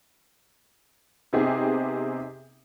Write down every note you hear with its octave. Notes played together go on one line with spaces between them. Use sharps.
C3 B3 C4 D#4 G4 G#4